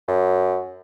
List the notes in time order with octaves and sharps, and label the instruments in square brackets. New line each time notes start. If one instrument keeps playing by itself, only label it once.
[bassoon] F#2